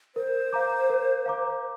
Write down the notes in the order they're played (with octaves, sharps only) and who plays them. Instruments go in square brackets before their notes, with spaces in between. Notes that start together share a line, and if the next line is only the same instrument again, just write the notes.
[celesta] A#4 [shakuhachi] C5
[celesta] F5 A#5 D6
A#4
F5 A#5 D6